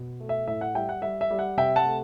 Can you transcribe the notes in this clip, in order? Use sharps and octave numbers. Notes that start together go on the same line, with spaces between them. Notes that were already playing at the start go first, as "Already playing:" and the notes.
Already playing: B2
A3
E5
A2 E5
F#5
G3 E5 G5
F#5
G3 E5
E5
G3
F#5
C3 E5 G5
F#5 A5
A3